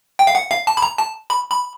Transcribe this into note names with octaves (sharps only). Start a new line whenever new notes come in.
G5
F5
F#5
F5
A5
B5
A#5
A5
B5
B5